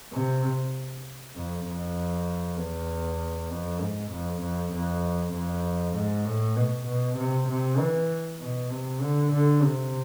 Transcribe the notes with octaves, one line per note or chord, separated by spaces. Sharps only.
C3
F2
F2
E2
F2
G#2
F2
F2
F2
F2
G#2
A2
B2
B2
C3
C3
E3
B2
C3
D3
D3
C3